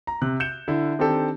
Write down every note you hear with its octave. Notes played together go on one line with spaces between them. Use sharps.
A#5
C3 F#6
G6 C#7 E7
D3 E4
D#3 C4 D4 G4 A4